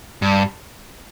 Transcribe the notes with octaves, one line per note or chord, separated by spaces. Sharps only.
G2